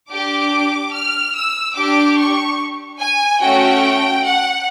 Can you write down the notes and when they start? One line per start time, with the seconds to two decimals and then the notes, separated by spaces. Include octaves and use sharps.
0.11 D4 G4 D6
0.93 F6
1.34 E6
1.75 D4 G4 D6
2.17 C#6
2.99 G#5
3.41 A3 C#4 F#4 G5
4.23 F#5